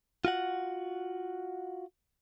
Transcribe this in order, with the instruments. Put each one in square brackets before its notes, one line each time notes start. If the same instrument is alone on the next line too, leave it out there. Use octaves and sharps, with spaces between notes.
[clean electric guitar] F4 F#4 F#5